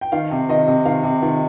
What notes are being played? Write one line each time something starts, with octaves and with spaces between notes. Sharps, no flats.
G5
D#3 F5
C3
D#3 D#5
C3
D#3 F5
C3
D#3